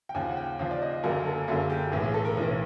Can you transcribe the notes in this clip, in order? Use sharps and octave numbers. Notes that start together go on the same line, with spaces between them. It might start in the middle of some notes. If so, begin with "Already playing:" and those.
G5
D#2 C#3 F3 G#5
F#5
G5
D#2 C#3 F3 F5
D5
D#5
F#1 F#2 D3 F#3 A#3 A#4
A4
F#1 F#2 D3 F#3 A#3 G#4
G4
B1 A2 E3 G#4
G#4
A4
A#4
B1 A2 E3